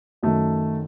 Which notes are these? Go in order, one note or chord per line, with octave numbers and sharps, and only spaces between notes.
F#2 D#3 A3